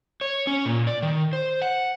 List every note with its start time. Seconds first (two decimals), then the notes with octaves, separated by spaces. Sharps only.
0.21 C#5
0.47 C#4
0.65 A#2
0.87 D5
1.02 D#3
1.33 C5
1.62 F#5